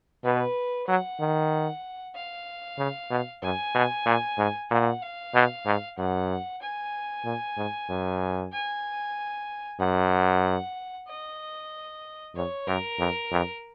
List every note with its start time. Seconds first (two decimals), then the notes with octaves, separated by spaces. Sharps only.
0.24 B2 B4
0.87 F#3 F#5
1.20 D#3
2.15 F5
2.78 C#3
3.10 B2
3.42 F#2 G#5
3.75 B2
4.06 A#2
4.38 G#2
4.70 A#2 F#5
5.02 F5
5.34 B2
5.65 G#2
5.98 F#2 F#5
6.61 G#5
7.25 A#2
7.57 G#2
7.89 F#2
8.52 G#5
9.80 F#2 F#5
11.08 D#5
12.35 F2 C#5
12.67 F#2 A#4
12.99 F2
13.32 F2